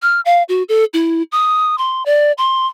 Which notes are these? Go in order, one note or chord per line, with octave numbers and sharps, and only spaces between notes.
F6
F5
F#4
A4
E4
D#6
C6
D5
C6